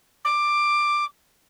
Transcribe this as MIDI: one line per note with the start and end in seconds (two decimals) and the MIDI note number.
0.24 1.05 86